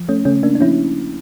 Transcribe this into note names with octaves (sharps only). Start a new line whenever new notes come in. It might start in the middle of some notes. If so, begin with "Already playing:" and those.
Already playing: F3
A3 C#4
C#3 A3 C#4
A#3 D4
D4
F3 C#4 E4